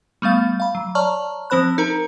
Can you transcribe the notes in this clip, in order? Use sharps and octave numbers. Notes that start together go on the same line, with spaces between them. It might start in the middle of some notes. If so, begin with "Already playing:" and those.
G3 A3 B3 F5 A6
F5 B5
F#3
C#5 D5 A5 A#5 C#6 F6
F3 C4 C5 B5 F#6
D#4 A#4 A#5